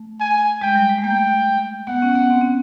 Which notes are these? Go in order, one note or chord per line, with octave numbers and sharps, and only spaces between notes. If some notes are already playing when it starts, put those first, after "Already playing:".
Already playing: A3
G#5
G#3 G5
G3
G#3
A3
A#3 G5
B3 F#5
C#4
B3
C4
C#4